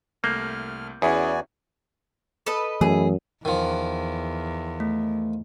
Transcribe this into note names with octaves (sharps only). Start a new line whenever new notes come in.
C2 A3 A#3 F6 G6
E2 C#4 E4 F#4 G#4 D5 G#5
A4 B4 D#5
F#2 E3 A3 G#4
E2 D#3 F3
A3